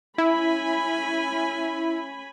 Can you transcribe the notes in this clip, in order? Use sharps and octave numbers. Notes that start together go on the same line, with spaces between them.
C#4 E4 G#5 B5